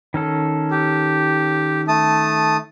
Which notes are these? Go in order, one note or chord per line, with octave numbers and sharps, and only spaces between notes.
D#3 C#4 A4
G4
A3 A5 D#6